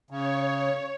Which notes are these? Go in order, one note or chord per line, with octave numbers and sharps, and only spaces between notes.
C#3 C#5